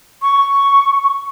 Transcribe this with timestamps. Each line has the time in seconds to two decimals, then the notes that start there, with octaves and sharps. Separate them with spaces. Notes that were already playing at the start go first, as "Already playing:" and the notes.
0.22 C#6